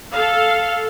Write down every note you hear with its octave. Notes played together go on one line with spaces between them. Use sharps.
A4 F5